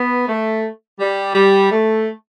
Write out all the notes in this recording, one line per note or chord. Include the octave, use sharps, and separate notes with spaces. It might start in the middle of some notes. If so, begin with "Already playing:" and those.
Already playing: B3
A3
G3
G3
A3